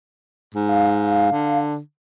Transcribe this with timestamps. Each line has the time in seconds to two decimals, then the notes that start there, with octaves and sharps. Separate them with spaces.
0.55 G#2
0.69 F5
1.32 D3